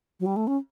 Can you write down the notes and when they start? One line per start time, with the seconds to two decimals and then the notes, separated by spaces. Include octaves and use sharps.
0.20 F#3
0.26 G3
0.36 A3
0.47 C#4